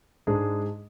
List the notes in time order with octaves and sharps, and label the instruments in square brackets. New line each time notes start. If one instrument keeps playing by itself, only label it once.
[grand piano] G#2 G#3 D4 G#4